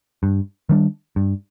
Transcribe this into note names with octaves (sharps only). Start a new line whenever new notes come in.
G2
D#3 G3 D4
G2